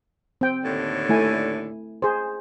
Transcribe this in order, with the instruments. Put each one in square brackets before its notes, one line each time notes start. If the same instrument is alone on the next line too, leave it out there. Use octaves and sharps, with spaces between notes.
[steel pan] C4 G5
[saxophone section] D#2 A2 D3
[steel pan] A3 E4 G#5
G#4 C5